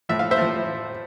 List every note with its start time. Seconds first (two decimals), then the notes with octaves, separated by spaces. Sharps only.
0.09 A2 F3 E5
0.19 F5
0.31 C5 E5
0.38 A2 F3